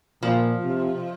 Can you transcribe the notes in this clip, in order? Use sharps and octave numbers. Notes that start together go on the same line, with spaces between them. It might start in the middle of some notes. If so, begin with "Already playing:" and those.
A#2 F3
C3